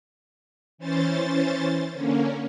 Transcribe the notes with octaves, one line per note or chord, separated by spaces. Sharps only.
E3 C#4 C5 A6
D3 A#3 C#4